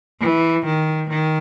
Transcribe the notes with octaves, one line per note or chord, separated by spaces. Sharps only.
E3
D#3
D#3